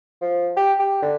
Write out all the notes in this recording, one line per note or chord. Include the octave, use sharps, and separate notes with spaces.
F3
G4
G4
D3